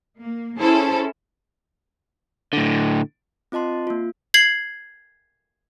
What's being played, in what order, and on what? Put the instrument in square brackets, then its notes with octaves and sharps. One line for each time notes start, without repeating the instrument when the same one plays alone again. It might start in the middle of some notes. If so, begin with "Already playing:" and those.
[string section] A#3
C#4 E4 G#4 A4 C5 A5
[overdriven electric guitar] A2 D3
[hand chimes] C4 F4 D#5 A5 C6
A#3 F4
[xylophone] G#6 C7 F#7